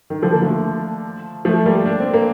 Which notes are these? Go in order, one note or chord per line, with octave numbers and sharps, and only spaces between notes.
D#3
D3 F3
A#3
F3 A3
F3 A3
G3 A#3
D4
C4
A#3